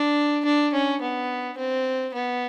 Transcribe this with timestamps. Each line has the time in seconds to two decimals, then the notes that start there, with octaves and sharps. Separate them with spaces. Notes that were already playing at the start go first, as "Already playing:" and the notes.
Already playing: D4
0.45 D4
0.73 C#4
1.01 B3
1.57 C4
2.14 B3